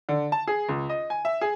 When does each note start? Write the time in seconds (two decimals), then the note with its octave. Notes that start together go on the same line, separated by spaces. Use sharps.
0.09 D3
0.32 A5
0.48 G#4
0.69 C#2
0.89 D#5
1.10 G#5
1.25 E5
1.41 G#4